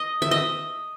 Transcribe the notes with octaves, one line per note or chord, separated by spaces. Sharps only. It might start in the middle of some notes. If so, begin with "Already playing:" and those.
Already playing: D#5
E5
D#5